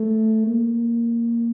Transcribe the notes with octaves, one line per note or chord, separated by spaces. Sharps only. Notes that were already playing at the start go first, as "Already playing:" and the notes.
Already playing: A3
A#3